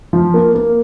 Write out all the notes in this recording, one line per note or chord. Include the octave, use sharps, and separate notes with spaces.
F3
A#3
A#3